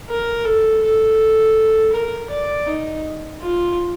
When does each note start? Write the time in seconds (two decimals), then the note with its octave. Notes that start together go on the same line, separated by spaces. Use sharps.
0.09 A#4
0.45 A4
0.83 A4
1.93 A#4
2.30 D5
2.66 D#4
3.41 F4